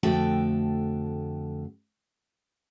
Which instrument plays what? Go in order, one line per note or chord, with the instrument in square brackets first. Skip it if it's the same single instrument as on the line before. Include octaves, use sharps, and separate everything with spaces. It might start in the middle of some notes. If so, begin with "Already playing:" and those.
[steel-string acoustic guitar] F2 D3 A3 F#4 A4 G5